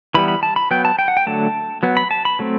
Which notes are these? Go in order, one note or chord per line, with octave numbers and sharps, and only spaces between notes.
E3 G3 B3 B5
B5
A5
B5
F#3 B3 G5
A5
G5
F#5
G5
D3 F#3 A3 A5
F#3 B3
B5
A5
B5
F#3 A3 C4